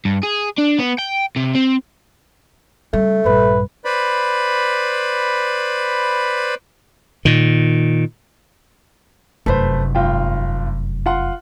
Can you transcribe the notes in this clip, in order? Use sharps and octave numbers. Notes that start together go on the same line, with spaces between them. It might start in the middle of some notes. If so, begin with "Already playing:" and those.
G2
G#4
D4
B3
G5
C3
C4
C#3 G3 A3
A#1 G2 B4
B4 C5 D5 B5
A#2 D#3
F1 F#2 A3 B4 C5
G#1 F4 G5
F4 F#5 C6